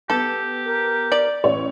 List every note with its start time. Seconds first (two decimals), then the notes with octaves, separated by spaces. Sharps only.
0.10 B3 G4 A4
0.65 A#4
1.12 D5
1.44 A1 C#5